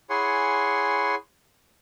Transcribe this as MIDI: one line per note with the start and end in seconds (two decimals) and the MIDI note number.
0.10 1.15 64
0.10 1.15 68
0.10 1.15 73
0.10 1.15 78
0.10 1.15 80
0.10 1.15 84